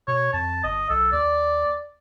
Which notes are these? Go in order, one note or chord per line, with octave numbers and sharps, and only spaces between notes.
B2 C#5
F2 A5
G1 D#5
B1 A4
D#2 D5